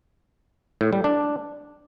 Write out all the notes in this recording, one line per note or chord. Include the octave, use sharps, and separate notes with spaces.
A2
G3
D4